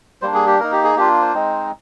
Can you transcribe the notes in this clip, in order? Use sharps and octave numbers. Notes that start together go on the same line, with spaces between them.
G3 A#3 D4 C5
G#4
G4
A#3 D#4 A#4
G4
G#4
A#3 D4 F4 G4
C5
G#3 C4 D#4